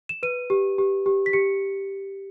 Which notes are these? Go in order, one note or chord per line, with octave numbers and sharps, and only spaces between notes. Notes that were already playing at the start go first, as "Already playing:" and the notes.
E7
B4 D#7
G4
G4
G4
B6
G4 C#7